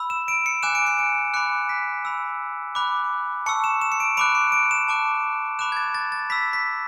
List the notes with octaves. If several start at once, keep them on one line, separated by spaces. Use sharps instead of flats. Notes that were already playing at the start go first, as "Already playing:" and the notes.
Already playing: B5 E6
E7
D7
C#7
G#5 D6 F#6 E7
D7
C#7
D7
B5 D6 F#6 C#7
B6
B5 E6
B5 D6 F#6
A5 C#6 E6 C#7
E7
E7
C#7
D7
B5 D6 F#6 D7
C#7
D7
E7
A5 D6 F#6
B5 D6 F#6 E7
G#6
A6
A6
A6
B5 E6 B6
B6